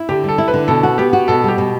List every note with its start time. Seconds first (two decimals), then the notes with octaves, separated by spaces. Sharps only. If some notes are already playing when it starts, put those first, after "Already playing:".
Already playing: E4
0.09 D3 G4
0.24 G3 A4
0.38 E4
0.48 B4
0.54 D3
0.68 B2 A4
0.83 F#4
0.98 B3 G4
1.13 F#4
1.28 B2 A4
1.44 G3 G4
1.58 B2